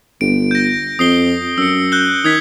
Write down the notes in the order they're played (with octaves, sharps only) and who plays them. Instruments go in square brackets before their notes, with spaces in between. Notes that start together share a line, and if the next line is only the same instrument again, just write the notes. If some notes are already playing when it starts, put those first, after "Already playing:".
[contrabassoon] G1 [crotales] D7
[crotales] G6 A#6
[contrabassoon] F2 [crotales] D#6 C7 G7
[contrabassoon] F#2 [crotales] E6 C#7
[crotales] F#6 G6 G7
[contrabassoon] D#3 [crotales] D#6 G#6 B6